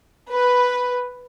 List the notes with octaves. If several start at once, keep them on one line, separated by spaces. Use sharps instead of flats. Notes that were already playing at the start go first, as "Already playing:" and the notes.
B4